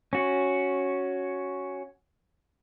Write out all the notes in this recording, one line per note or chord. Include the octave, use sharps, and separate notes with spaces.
C#4 F#4